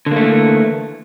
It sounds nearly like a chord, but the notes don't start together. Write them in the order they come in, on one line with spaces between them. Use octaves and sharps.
D3 A#3 A3 E3